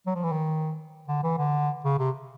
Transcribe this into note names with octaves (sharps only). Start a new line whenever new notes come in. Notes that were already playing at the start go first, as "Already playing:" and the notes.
F#3
F3
E3
D#3
D3
E3
D3
C#3
C3